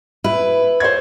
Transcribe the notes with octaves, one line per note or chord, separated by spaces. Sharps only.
E4 B4
C5 C#5 G#6